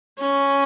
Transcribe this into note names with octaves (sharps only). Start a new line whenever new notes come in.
C#4